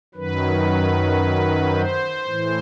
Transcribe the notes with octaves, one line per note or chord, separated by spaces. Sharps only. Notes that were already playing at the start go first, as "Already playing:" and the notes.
F#2 D#3 F#3 B4
C5
A2 E3